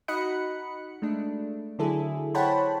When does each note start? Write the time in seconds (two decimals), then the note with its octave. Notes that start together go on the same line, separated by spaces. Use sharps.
0.08 D#4 F#4 D#5 B5 F#6 C#7
1.02 G#3 A3 D4
1.79 D3 F#3 E4 G#4 A4
2.35 C5 C#5 F#5 G5 A5 B5